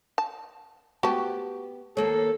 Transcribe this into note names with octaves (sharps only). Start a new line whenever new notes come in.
A5
B3 F#4 G4 A5
D#2 A#3 A4 C#5